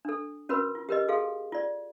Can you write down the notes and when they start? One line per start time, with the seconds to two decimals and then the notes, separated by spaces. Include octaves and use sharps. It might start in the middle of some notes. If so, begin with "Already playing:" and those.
0.05 D4 A4
0.49 C#4 F#4 A#4 B4 B5
0.75 F4
0.89 G4 A#4 B4 D#5
1.08 F#4 G#4 A4 F5
1.52 F4 D5